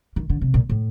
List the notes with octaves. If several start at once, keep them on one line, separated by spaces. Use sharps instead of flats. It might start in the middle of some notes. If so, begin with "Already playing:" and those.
D#3
D3
C3
A#2
A2